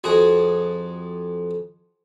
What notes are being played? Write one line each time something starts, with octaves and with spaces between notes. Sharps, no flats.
F2 F#4 G#4